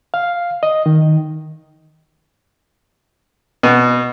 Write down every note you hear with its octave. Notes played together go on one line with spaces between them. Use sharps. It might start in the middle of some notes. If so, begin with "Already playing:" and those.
F5
D#5
D#3
B2